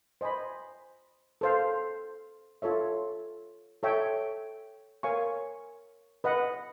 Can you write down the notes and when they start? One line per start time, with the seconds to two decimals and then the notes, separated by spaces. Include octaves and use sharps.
0.21 C5 D#5 G#5 B5
1.41 A4 C5 F5
2.62 F4 A4 C#5 E5
3.83 A4 C#5 E5 G5
5.03 A#4 C#5 F5 G#5 C#6
6.24 B4 D#5 F#5